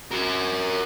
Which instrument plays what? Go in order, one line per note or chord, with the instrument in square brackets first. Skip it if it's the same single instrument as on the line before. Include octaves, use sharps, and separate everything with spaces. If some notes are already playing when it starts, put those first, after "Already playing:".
[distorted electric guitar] F#4 A#4